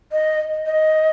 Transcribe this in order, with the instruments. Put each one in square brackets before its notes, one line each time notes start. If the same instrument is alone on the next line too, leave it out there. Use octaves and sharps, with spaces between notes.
[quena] D#5
D#5